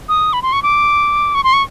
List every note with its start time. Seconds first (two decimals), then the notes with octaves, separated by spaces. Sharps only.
0.09 D#6
0.33 B5
0.42 C6
0.53 C#6
0.63 D6
1.35 C#6
1.44 C6
1.53 C#6